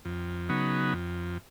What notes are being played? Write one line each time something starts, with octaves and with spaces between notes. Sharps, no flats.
F2
C#3 F#3 B3 D#4
F2